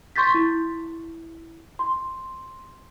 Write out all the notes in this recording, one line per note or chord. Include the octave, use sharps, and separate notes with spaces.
C6 C#6 G6 A6 B6
E4
C6